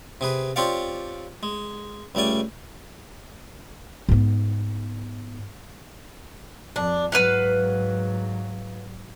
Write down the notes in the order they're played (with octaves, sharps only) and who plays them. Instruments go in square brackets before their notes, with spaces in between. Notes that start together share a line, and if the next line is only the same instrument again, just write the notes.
[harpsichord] C3 G#4 B4
C4 F4 G4 C#5 D5 F5
G#3
C#2 G3 A3 D5 G#5
[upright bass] G#2 B3
[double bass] F2 [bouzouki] D4
[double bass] G#2 F#3 [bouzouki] B4 F5 F#5